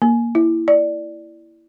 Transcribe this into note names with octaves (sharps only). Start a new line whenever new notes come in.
A#3
E4
D5